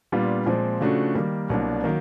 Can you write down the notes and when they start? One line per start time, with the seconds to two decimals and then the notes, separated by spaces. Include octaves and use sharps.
0.12 A#2 G3 B3 D4 F4
0.46 A#2 F3 G#3 C4
0.81 C#3 F3 A3 D4 F#4
1.15 D#3 G3 A#3
1.49 C2 B2 F#3 A#3 D4
1.84 D#3 F#3 A#3